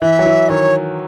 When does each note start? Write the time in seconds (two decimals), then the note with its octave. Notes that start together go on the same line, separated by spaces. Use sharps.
0.01 E3 E5
0.19 F#3
0.26 E3
0.49 D#3 C#5